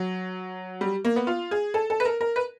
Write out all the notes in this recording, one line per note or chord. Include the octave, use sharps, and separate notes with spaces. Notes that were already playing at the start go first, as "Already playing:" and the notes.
Already playing: F#3
G3
A#3
B3
F4
G#4
A4
A4
B4
A#4
A#4
B4